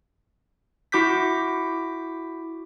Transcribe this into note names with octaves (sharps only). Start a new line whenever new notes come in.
E4 F#4 D6 G6 B6